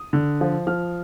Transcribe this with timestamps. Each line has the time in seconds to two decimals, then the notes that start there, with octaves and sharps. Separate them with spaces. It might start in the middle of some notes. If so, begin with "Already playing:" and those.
Already playing: D#6
0.13 D3
0.41 F3
0.67 F3 F6